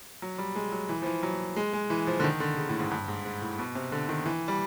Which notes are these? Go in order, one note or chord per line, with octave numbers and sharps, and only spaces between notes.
F#3
G3
G#3
F#3
E3
F3
E3
F#3
G#3
G#3
E3
F3
D3
D#3
D3
C#3
A2
G#2
G2
G#2
G#2
A2
B2
C3
D3
D#3
E3
G3